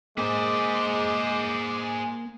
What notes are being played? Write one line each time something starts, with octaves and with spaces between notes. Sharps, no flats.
G#3 A#3 G#4 C5 D6